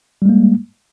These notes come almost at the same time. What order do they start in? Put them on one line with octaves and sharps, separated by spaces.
G3 G#3 A#3